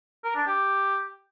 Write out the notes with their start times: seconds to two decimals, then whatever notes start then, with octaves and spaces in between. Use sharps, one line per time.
0.24 A#4
0.35 D4
0.46 G4